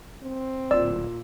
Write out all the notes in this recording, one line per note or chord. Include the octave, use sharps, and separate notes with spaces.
C4
D1 A#2 D5 E6